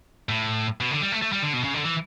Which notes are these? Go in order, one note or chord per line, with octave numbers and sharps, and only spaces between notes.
A2
B2
D3
G3
A3
A3
G3
D3
B2
C#3
D3
E3